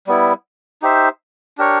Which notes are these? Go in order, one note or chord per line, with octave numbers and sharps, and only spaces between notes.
G3 B3 E4
D#4 G4 C5 E5
D4 G4 A#4 C#5